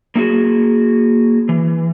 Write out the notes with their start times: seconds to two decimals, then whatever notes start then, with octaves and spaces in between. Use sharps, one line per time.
0.15 A#3 D#4 E4 F#4 G#4
1.49 E3